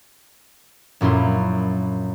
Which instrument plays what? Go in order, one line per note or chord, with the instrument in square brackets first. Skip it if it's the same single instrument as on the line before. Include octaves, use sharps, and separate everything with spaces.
[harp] A#1 F#2 A#2 E4 C6